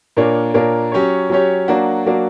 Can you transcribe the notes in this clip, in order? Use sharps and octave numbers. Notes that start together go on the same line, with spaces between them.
A#2 A#3 D4 A#4 C#5
A#2 A#3 D4 A#4 C#5
F#3 C#4 G4 C#5
F#3 C#4 G4 C#5
F#3 A#3 D4 F#4
F#3 A#3 D4 F#4